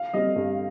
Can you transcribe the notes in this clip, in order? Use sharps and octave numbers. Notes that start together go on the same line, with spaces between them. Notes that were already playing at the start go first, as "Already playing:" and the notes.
Already playing: F5
G3 C4 D#5
G2